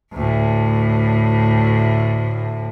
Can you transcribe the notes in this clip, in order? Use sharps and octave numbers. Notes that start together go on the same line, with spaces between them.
D2 A2